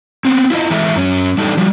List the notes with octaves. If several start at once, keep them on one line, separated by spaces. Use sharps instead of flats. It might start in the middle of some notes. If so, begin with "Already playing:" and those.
B3 C4
E4 F4 B4 D#5
E3 G#3 A3 A4 E5 A#5
F#2 C#4
G3 D4 D#4 G4 A4
F3 G3